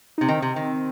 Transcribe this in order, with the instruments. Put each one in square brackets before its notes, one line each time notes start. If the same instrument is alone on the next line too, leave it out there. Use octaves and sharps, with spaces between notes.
[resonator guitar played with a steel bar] C3 [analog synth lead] D#4
[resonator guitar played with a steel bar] D#3 [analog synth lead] C4
[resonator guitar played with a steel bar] C3
D#3